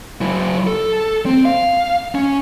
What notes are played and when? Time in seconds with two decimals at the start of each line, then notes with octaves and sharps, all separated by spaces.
0.21 F#3 E4
0.67 A4
1.26 C4
1.45 F5
2.15 C#4